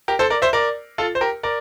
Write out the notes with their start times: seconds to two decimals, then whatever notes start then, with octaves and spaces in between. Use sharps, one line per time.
0.08 G4 A#4
0.19 A4 C5
0.30 A#4 D5
0.42 C5 E5
0.53 A#4 D5
0.98 F4 A4
1.15 C5
1.21 G4 A#4
1.43 A#4 D5